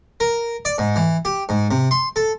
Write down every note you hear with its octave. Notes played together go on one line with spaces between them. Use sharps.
A#4
D5
G#2
E3
G4
G#2
C3
C6
A4